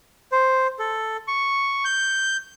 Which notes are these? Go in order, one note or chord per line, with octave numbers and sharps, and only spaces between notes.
C5
A4
C#6
G6